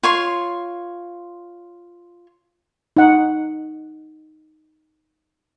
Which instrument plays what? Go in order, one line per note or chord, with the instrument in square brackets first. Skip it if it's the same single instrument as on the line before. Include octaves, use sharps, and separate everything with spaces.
[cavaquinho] F4 C#5 C6
[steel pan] D#4 F#5